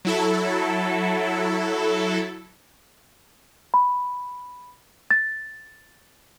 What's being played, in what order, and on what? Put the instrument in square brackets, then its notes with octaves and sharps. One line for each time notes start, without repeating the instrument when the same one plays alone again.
[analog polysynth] F#3 E4 A4
[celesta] B5
A6